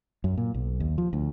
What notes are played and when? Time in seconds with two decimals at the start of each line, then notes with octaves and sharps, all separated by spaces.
0.24 F#2
0.37 A#2
0.54 B1
0.80 D#2
0.98 F3
1.13 D2